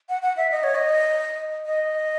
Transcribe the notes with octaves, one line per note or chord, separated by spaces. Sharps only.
F#5
F#5
E5
D#5
C#5
D#5
D#5